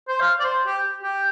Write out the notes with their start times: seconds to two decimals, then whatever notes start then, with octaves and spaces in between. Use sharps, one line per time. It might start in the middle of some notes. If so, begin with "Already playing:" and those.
0.08 C5
0.20 F5
0.40 D5
0.43 C5
0.66 G4
1.03 G4